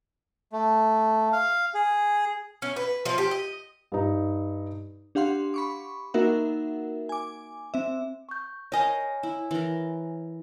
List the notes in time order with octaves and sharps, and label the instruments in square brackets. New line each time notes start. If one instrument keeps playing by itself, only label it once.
[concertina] A3
F5
G#4
[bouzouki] C#4
B4
F3
G4
D#5
[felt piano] G2 D#4
[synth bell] D4 G4 F5 F#5 C6
B5 C#6 D6
A#3 D#4 F#4 A#4 E5 F#5
G#5 D6
C4 E5
[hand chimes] C#6 G6
[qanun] A#4 D#5 F5 [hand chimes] C#5 G#5 G6
[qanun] E4
E3 A#4